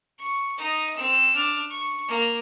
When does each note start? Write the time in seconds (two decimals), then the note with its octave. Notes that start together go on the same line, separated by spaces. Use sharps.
0.19 C#6
0.58 D#4 D#5
0.95 C4 E6
1.35 D4 F6
1.70 C#6
2.08 A#3